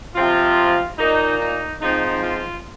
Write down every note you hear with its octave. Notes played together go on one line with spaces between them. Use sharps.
C3 F3 C4 F4
A#2 A#3 D#4
D#4
G#2 F3 C4 D#4
F4